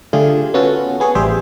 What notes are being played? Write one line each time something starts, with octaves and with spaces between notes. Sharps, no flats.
D3 A3 F4 G4 G#4
B3 C#4 F4 F#4 A4
B3 G#4 C#5
A1 G3 G#4 C5 E5 G5